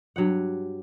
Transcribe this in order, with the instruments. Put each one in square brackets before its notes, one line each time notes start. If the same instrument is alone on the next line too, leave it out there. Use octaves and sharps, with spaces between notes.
[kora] G2 F#3 G4 F#5